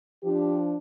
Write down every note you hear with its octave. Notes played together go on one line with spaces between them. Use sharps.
F3 D4 G4